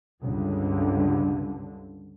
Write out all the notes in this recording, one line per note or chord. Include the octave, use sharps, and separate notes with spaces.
C#2 G2 D3